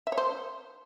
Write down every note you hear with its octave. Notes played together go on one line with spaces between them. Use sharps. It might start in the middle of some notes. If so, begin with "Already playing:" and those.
E5
C#5
C5